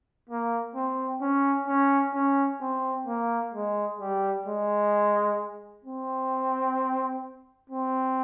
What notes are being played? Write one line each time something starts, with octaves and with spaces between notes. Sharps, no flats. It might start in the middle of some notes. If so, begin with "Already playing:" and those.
A#3
C4
C#4
C#4
C#4
C4
A#3
G#3
G3
G#3
C4
C4